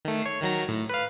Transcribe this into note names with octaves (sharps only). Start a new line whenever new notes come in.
D#3 A3
C#5 C7
D#3 F#3 A#5
A2
B4 F5